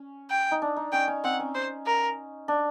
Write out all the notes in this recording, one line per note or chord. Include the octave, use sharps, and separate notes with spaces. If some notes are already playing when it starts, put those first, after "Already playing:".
Already playing: C#4
G5
D#4
D4
D#4
C#4 G5
C#4
C4 F#5
C#4
C5
A#4
D4